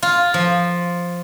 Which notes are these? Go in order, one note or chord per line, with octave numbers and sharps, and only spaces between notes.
F4
F3